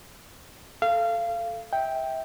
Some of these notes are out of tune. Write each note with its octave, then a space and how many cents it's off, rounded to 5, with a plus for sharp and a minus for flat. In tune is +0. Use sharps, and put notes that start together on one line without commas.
A4 +0 F5 -25
E5 -25 G5 +0